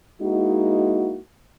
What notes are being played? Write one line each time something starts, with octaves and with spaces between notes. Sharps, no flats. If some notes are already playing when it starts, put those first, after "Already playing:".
G#3 A#3 D#4 E4 F#4